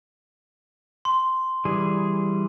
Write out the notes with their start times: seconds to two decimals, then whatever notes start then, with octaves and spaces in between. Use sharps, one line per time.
1.05 C6
1.65 E3 G3 G#4